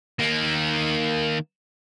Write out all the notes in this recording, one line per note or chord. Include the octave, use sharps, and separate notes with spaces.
D#3 A#3